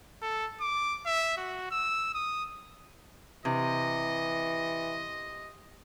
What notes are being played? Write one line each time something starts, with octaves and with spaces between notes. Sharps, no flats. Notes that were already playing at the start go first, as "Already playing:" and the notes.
A4
D6
E5
F#4
E6
D#6
C3 E3 D#5